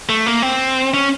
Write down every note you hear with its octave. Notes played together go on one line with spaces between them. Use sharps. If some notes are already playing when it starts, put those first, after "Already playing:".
A3
A#3
C4
C#4